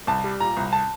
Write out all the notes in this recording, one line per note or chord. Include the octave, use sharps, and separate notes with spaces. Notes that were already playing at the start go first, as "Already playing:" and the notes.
C2 A5
G3
A#2 A#5
C2
A5